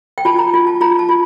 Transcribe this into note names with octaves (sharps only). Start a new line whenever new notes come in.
G5
F4 A5
A#5
F4
A5
F4 A#5
A5
F4